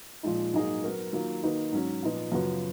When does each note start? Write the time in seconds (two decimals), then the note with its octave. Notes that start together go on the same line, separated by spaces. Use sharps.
0.23 A#2 F3 G#3 D#4
0.54 G#2 F#3 A#3 D#4 G#4
0.84 F#3 B3 F#4 A#4
1.13 D#3 F#3 A#3 F4
1.43 D#3 A#3 D#4 F#4 B4
1.72 G#2 F#3 C#4
2.03 A#2 F3 B3 D#4
2.32 F#2 C#3 F3 B3 F#4